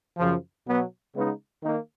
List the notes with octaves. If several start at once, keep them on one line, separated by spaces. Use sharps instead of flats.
F#2 C#3 F3
B2 F#3 B3
C#3 G#3 B3 D#4
D#3 A#3 D#4